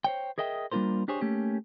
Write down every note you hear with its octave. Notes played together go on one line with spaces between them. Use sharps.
C5 C#5 G5
G#4 A#4 D#5 E5 G5
G3 A#3 D4 F4 A#4 C5
D4 G4 G#4 C5 C#5
A3 A#3 C#4 G4